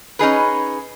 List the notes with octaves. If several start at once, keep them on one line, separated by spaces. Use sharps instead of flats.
C#4 D#4 G#4 B4